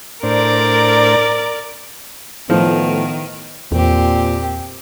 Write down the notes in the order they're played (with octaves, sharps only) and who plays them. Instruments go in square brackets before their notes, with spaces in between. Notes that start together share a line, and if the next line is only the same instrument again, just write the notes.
[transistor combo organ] A2 D4 C5 [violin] A#4 D5
[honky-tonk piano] A2 [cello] D#3 [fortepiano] F3 [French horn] B3
[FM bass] E2 [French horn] A#2 [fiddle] C4 G4